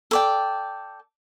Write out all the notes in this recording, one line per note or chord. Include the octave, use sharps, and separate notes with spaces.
A4 D5 G5